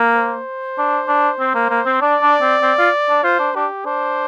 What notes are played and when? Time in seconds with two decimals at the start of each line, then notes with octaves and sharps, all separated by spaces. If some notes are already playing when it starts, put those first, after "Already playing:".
Already playing: A#3
0.16 C5
0.78 D4
1.08 D4
1.39 C4
1.55 A#3
1.70 A#3
1.86 C4
2.01 D4 D5
2.22 D4
2.41 C4
2.62 C4
2.78 F4
3.09 D4
3.23 F4 C5
3.39 D4
3.55 D4 G4
3.85 D4 C5